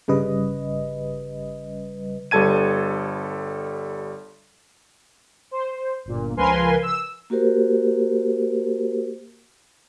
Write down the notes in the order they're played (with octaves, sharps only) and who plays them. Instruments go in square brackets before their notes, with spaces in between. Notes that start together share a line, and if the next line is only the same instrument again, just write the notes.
[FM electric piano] G1 C#3 G3 B4 D#5
[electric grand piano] G1 G3 A4 A5 G#6 D#7
[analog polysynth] C5
G1 A#2
C#2 F3 A#4 B4 G#5 C6
E6
[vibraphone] A#3 F#4 G4 A#4 C5